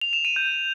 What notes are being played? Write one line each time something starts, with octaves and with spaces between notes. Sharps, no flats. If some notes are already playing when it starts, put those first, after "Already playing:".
F7
E7
D#7
G6